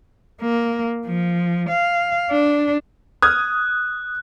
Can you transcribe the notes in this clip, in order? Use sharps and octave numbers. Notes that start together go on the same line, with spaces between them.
A#3
F3
F5
D4
D#6 F6 F#6 G#6